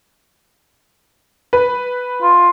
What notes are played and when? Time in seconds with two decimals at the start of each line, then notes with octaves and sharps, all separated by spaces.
1.53 B4
2.22 F4